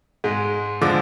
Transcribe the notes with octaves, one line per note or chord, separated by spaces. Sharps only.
G#2 G#3
D3 F3 G#3 D6